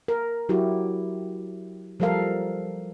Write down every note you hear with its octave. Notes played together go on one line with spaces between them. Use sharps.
A#4
F#3 E4 F#4 G4
F3 G3 A4 A#4 F5